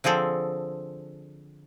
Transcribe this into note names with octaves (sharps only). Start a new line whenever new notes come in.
D3 F3 C4 G#4 A4